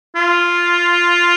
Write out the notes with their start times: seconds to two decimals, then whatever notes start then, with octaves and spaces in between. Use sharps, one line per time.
0.16 F4